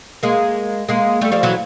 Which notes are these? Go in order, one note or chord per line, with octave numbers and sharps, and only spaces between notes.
G#3 A#3
G#3 A#3
G3 A3
F3 G3
E3 F#3